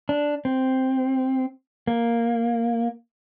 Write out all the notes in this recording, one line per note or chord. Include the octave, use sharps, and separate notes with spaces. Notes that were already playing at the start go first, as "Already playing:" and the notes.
D4
C4
A#3